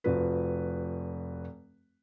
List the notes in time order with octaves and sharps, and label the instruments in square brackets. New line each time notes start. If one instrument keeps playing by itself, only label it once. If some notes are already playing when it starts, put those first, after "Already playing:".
[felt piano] F1 F3 F#4 B4